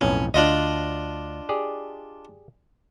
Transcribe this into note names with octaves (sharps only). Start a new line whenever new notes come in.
B1 F2 A2 C#4
D2 D4 F4 D#5
G4 G#4 D5